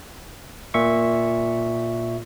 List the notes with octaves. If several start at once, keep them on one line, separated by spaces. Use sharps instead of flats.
A#2 E5 C#6